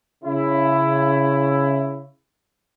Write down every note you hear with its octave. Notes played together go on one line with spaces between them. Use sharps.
C#3 E4